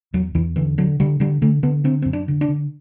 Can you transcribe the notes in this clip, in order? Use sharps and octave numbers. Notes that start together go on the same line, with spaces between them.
E2 F#3
E2 E3
D3 E3
D3 F#3
D3 G3
D3 G3
D3 A3
D3 B3
D3 C4
F#2 C4
D4
D3
D4
D3